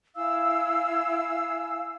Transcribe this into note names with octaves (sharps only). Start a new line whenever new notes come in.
E4 F5 G#5 E6